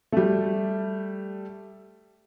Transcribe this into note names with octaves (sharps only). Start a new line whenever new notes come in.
G3 A3